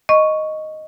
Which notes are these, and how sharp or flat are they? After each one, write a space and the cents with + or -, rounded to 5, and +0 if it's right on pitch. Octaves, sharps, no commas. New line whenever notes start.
D#5 +0 C#6 +0